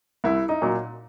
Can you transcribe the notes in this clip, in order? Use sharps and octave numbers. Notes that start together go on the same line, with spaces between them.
C2 E4
D#4
A#2 F#3